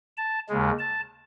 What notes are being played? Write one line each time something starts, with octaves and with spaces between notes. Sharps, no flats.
A5
D#2 C#3 G#3
A5